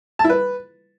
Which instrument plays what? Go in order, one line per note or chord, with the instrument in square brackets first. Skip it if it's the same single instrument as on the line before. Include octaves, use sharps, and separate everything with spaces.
[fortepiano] A5
E4
B4